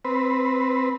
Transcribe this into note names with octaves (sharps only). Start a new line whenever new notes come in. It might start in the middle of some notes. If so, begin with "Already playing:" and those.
C4 B4